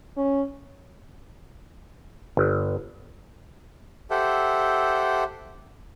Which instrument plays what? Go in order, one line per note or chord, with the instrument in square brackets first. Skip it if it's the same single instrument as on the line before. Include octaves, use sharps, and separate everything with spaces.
[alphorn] C#4
[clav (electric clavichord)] G1
[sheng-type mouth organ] G4 A4 C5 E5 F#5